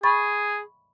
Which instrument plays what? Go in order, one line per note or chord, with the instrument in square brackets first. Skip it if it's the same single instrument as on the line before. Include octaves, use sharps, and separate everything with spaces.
[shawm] G#4 [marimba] B5 C#6 A6